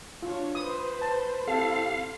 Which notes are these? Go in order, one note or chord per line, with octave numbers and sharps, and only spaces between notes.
D4 F4 C#5
B4 C5 D#6
A5
C4 E4 G4 A4 F5